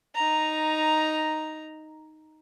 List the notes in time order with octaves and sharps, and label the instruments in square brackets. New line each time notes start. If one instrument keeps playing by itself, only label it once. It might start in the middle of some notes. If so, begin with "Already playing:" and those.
[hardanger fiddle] D#4 A#5